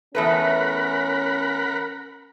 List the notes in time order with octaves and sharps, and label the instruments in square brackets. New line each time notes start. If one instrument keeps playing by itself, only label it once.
[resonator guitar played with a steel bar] E2 A3 B4 [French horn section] C#4 [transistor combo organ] A#4 F#5 B5